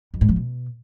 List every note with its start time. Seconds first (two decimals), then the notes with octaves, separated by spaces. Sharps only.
0.14 F2
0.21 G#2
0.29 F3
0.36 B2